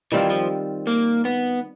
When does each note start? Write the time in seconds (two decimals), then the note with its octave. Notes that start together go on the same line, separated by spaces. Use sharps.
0.12 D#3 E3 G3 C4 F4
0.30 F3
0.87 A#3
1.25 B3